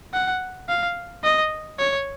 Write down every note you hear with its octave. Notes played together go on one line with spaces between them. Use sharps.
F#5
F5
D#5
C#5